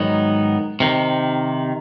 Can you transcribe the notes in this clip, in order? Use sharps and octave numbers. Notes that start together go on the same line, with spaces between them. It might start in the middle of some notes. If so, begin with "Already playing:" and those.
Already playing: G#2 D#3 F#3 B3 D#4
C3 D#3